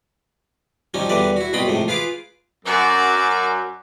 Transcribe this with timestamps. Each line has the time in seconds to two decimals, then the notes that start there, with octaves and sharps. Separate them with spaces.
0.94 F3 G3 C#4 D#4
1.09 E2 D3 E3 G3 B4 D5
1.37 E4 F#4
1.53 C2 B2 F4 G5 B5 D#6
1.66 C#2 A2 C3 F3
1.88 F4 G#4 B4 F5 D6
2.66 F#2 F#4 D5